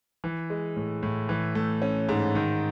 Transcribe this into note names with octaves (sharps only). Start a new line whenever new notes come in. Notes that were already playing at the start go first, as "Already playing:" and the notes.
E3
G#3
A2
A2
E3
A3
C#4
G#2
D#3